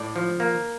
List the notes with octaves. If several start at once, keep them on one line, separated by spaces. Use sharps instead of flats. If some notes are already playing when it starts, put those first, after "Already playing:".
Already playing: A2 D5
F3
A#3